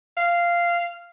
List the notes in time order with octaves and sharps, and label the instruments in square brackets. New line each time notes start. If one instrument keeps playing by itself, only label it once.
[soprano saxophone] F5